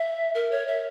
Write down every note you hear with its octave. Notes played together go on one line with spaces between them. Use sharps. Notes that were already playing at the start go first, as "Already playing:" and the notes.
Already playing: E5
A#4
C#5
E5